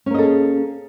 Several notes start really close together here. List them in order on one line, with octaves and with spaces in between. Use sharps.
C#4 A#3 D#5 A4 G#4